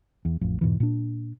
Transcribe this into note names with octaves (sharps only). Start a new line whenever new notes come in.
E2
A1 F2
E2 G#2 B2 E3
A#2 D4